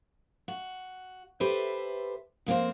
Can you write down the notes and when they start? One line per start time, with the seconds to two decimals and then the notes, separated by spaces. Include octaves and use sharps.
0.48 F#4
1.40 G4 A4 B4 C5 E5
2.46 F2 A#3 C4 C5